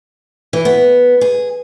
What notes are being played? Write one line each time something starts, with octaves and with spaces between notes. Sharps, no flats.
E3
B3
G#4